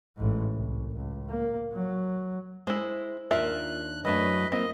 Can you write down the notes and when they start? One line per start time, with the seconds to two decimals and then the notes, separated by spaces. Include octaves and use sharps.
0.17 A1 G#2
0.53 C2
0.96 C#2
1.29 A#3
1.73 F#3
2.67 G#3 E4 C5
3.31 D#2 G#2 D4 F4 A#4 E5 F#6
4.05 F#2 E3 F#3 A3 D4 B4 D#5
4.52 A#3 C4 F4 D#5